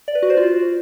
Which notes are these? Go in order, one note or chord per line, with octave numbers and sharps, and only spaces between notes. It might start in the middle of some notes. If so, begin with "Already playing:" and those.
D5
B4
F#4
C5
F4